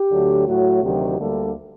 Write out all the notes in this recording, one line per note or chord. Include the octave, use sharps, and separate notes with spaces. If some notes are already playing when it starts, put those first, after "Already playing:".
Already playing: G4
D2 D3 F#3 A3
A2 F#3 A3 F#4
D2 C3 D#3 F#3 G4
D2 D3 G3 A#3 A4